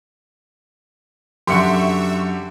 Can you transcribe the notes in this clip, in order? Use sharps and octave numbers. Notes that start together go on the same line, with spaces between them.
F#2 D3 G4 E5 F#5 C6 C#6 C#7